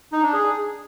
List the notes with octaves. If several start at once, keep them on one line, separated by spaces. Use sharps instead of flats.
D#4
D4
G#4